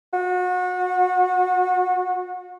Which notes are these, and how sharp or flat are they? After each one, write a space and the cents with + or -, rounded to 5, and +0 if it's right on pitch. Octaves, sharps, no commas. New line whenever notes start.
F#4 -30